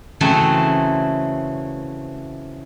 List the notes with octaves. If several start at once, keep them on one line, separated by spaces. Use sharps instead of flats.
C#3 E3 F#3 A3 C4